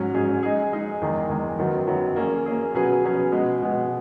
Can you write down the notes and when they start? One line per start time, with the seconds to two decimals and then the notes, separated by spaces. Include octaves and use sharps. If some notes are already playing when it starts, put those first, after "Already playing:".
Already playing: G#2 F#3 C#4
0.14 G#2 F#3 C#4 G#4
0.43 G#3 D#4 G#4
0.72 G#3 D#4 G#4
1.01 E2 D#3 G#3
1.29 E2 D#3 G#3
1.58 F#2 D#3 F#3 B3
1.87 F#2 D#3 F#3 B3
2.16 A#3 C#4 G#4
2.46 A#3 C#4 G#4
2.74 B2 F#3 C#4 G#4 B4
3.04 B2 F#3 C#4 G#4 B4
3.32 B2 G#3 B3
3.62 B2 G#3 B3